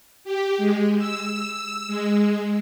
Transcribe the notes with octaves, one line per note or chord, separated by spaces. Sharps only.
G4
G#3
E6
G#3